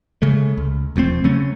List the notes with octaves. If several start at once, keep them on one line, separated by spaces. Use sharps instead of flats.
C#3 G#3 A3
C#2
E1 F2 A3 C4
C#3 F#3 A3 C#4